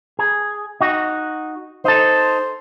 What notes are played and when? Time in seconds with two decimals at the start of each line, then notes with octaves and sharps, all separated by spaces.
0.19 G#4
0.81 D#4 F#4
1.85 D#4 A4 C5